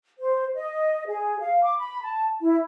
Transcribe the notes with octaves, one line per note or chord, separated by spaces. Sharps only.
C5
D#5
G#4
F5
D6
B5
A5
E4